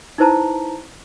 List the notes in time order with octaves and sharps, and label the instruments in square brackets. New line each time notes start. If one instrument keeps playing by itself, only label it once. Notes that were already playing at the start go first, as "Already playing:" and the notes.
[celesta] D#4 E4 B4 C5 A5 A#5